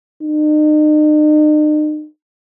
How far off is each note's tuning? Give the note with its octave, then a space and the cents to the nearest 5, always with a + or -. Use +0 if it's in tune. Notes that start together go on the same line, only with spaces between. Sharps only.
D#4 -40